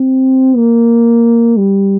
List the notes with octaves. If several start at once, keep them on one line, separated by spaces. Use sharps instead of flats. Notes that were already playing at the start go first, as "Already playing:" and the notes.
Already playing: C4
A#3
G3